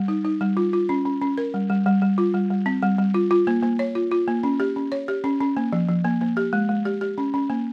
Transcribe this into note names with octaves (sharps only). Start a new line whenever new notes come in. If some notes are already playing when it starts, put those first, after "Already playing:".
Already playing: G3
D#4
D#4
G3
F4
F4
C#4
C#4
C#4
A#4
G3
G3
G3
G3
F4
G3
G3
C4
G3
G3
F4
F4
A#3
A#3
C#5
F4
F4
A#3
C#4
G4
C#4
C#5
G4
C#4
C#4
A#3
F3
F3
A#3
A#3
G4
G#3
G#3
G4
G4
C#4
C#4
A#3